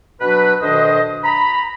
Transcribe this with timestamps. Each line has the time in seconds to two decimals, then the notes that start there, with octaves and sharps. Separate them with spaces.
0.21 B2 F#3 D4 F#4 B4
0.62 D2 B2 D#3 D4 C5 D#5
1.24 A#5 B5